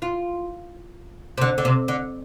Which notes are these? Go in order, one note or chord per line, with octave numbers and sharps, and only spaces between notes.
F4
C3
D3
D3
C3
D3